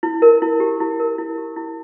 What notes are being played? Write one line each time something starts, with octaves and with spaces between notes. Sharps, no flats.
E4
A#4
E4
G4
E4
A#4
E4
G4
E4